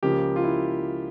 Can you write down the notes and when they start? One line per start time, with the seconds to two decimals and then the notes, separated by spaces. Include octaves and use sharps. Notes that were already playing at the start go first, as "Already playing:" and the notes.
0.03 C#2 C#3 F3 A#3 G4
0.36 F4
0.44 E4